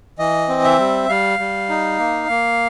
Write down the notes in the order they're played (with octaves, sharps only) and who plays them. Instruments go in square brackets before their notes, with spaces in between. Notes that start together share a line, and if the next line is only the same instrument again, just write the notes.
[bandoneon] E3 D#5
C4
E5
G3
G3 F5
G3
D#4
A#3
A#3